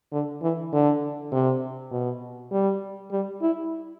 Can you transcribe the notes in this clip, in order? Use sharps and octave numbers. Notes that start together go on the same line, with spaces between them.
D3
E3
D3
C3
B2
G3
G3
E4